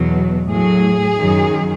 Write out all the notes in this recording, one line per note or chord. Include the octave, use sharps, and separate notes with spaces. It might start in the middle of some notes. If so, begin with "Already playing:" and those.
Already playing: E2 B2 F#3
A2 F#3 G#4
F#2 D#3 F#3